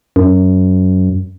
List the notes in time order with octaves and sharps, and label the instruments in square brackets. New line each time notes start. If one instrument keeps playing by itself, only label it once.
[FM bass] F#2